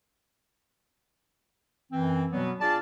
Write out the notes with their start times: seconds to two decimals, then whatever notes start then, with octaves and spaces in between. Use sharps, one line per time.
1.92 F#2 E3 C4
2.32 B2 F#3 G3 B3
2.60 D4 F4 G#4 D5 A5